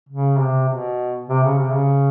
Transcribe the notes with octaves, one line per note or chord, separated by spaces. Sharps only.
C#3
C3
B2
C3
C#3
C3
C#3